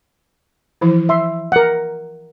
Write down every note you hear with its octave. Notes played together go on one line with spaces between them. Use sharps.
E3 F3 E4
E5 C6
A#4 F#5